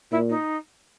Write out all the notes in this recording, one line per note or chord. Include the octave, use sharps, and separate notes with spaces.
A#2 E4
D#4